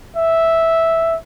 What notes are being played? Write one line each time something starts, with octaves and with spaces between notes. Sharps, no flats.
E5